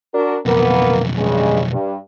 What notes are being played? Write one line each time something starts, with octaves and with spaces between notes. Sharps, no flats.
D4 F#4 A#4
B1 F2 A#3 B3 A#4
G2 C#3 G#3
G2